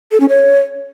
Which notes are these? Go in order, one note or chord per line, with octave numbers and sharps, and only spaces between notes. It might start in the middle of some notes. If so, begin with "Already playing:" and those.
A4
C#4
C#5